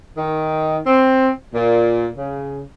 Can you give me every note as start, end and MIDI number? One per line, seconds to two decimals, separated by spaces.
0.17 0.78 51
0.86 1.30 60
1.53 2.07 46
2.18 2.63 49